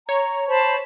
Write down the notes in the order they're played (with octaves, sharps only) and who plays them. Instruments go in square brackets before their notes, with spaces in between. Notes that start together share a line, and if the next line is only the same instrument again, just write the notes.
[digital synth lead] C#5 [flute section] A#5
[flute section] C5 A5 B5